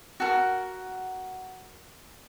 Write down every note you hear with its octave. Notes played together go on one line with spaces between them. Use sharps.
F#4 A4 A#4